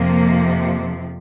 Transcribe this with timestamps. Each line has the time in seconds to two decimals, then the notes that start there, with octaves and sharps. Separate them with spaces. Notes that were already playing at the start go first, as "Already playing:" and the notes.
Already playing: F2 C3 F3 A#3